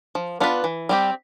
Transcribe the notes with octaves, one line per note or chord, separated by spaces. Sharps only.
F3
B3 D4 F4 B4
E3
G3 C4 G4